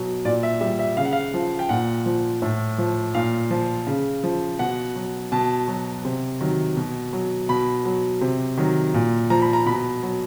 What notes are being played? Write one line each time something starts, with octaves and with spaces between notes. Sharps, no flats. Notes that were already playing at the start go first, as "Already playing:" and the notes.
Already playing: B2 F#3
A#2 D5
E5
G3 E5
E5
C#3 F5
F#5
F5
F3
G5
A#2 F#5
F3
A2
F3
A#2 F5
F3
C#3
F3
B2 F#5
F#3
B2 A5
F#3
C3
D#3 F#3
B2
F#3
B2 B5
F#3
C3
D#3 F#3
A#2
F3 A#5
B5
A#5
B2 B5
F#3